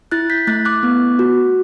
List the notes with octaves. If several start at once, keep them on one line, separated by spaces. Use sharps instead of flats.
E4 F#6 A6
G6 B6
A3 F#6 A6
D6 F#6
B3
F#4